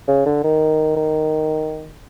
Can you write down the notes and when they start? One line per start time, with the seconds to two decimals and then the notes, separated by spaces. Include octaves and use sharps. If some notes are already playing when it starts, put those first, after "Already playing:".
0.08 C#3
0.26 D3
0.44 D#3
0.97 D#3